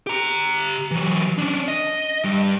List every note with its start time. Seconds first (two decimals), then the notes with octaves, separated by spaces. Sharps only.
0.07 G4 A#5
0.91 E3 F#3
1.38 C#4 D4
1.68 D#5
2.24 G2